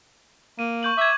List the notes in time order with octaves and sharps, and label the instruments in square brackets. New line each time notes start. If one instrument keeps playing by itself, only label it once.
[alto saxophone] A#3 [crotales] D#7
[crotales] C#6 G6 F#7
[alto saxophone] E5 [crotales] D6 G#6